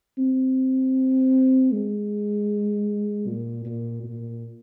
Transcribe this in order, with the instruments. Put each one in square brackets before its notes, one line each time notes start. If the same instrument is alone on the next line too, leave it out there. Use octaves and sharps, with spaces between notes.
[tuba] C4
G#3
A#2
A#2
A#2